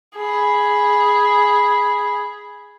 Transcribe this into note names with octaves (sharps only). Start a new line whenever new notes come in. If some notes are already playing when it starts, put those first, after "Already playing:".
G#4 B5